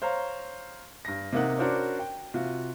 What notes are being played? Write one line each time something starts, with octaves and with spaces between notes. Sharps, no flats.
C5 C#5 F5 A#5
G2 A#6
C3 A#3 D#4 F#5
C#4 D4 F#4 A#4 C5 D5
G5
C3 F4 F#4